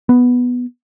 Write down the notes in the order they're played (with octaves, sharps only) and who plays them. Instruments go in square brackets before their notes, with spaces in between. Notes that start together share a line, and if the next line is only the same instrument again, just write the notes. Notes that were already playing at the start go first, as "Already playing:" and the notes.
[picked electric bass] B3